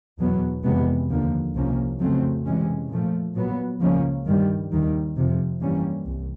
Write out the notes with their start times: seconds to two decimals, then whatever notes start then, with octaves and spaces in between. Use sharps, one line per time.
0.19 E2 B2 F#3 B3
0.63 F2 C3 E3 G#3 B3
1.09 D#2 D3 F3 A#3
1.54 C2 C3 F3 A#3 C#4
1.99 F2 C#3 F#3 A3 C4
2.45 C3 E3 G#3 C#4
2.89 A#2 F3 A3
3.34 A#2 F#3 B3
3.80 C#2 C#3 F3 A#3 C#4
4.26 G2 D#3 G3
4.70 D#2 D#3 G3
5.16 F2 C3 F3
5.60 G2 E3 G3 A#3 C#4
6.06 C2